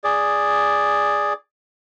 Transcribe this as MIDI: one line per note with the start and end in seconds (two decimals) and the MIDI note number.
0.04 1.33 68
0.04 1.33 74